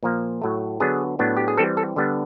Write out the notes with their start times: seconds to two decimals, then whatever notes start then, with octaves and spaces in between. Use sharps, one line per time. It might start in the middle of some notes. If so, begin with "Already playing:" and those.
0.03 A#2 F3 A#3
0.42 A2 F#3 A3
0.80 D3 F#3 B3 D4 G#4
1.19 A2 F#3 B3 D4
1.37 G4
1.48 G#4
1.58 E3 G3 C4 A4
1.77 A4
1.96 D3 G3 B3 D4